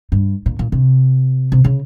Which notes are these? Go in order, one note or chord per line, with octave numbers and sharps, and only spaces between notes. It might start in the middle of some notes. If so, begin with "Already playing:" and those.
G2
A#2
A#2
C3
C3
C#3